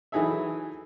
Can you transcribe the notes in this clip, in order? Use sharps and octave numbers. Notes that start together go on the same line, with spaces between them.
E3 F#3 D#4 G#4 A4 E5